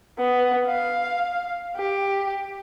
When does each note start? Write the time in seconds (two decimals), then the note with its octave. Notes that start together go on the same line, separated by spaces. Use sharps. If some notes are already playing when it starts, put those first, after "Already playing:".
0.18 B3
0.68 F5
1.76 G4